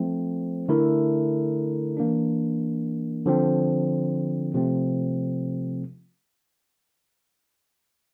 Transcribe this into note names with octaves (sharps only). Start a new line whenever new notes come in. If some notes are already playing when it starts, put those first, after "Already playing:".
Already playing: F3 A3 C4
D3 A3 E4 A#4
E3 A#3 D4
D3 F3 C4
C3 F3 A3 C4